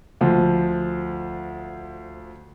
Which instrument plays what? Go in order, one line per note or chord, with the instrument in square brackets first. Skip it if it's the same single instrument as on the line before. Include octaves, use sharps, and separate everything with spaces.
[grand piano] D2 F3